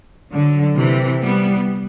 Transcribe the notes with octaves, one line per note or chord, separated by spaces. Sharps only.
D3 F#3
C3 E3
G3 B3